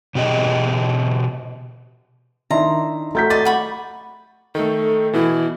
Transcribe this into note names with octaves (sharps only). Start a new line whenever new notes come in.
B2 G4 G#4 D#5
D#3 D4 E4 E5 A#5 C6
A3 F#4 A#5 G6 B6
D5 D#5 C6 A6
F#5 B5 C#6
D#3 A3 A4
B2 E3 E4